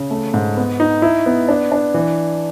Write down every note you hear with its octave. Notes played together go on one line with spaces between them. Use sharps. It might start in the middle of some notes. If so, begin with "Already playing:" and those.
Already playing: C#3
A3
G#2
B3
D#4
E4
B3
D4
D4
E3